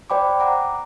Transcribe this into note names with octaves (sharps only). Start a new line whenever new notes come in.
C5 D5 G5 B5 D6
F#5 A#5 D6